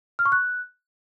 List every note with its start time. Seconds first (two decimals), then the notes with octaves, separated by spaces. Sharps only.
0.19 F6
0.25 C#6
0.32 F#6